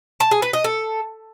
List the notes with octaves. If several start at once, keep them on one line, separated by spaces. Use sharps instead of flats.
A5
G#4
B4
D#5
A4